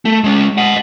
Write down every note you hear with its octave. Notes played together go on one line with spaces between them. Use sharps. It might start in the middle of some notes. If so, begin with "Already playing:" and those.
A3
G#3 C#4
D#5 F#5